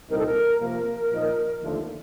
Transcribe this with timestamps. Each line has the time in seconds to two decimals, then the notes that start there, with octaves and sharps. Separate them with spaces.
0.10 C2 A#2 G3 C4 D#4 A#4
0.18 A4
0.26 A#4
0.60 C3 F3 A#3 A#4
1.11 A#2 F3 A#3 D#4
1.62 D#2 D3 F3 A3